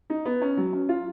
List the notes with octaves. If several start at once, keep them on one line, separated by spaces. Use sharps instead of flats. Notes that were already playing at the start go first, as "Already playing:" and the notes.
D#4
B3
C#4
F#3
C#4
F4